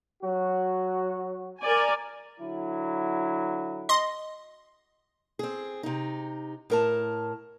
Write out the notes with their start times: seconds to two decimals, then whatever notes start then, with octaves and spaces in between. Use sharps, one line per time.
0.23 F#3 F#4
1.62 A#4 D5 G#5
2.40 D3 F#3 E4
3.89 D#5 C6
5.39 C4 G#4
5.83 C3 D#4
6.70 A2 A#4 A5